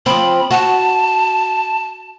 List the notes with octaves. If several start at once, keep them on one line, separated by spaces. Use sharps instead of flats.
F3 C4 B5
F#4 A5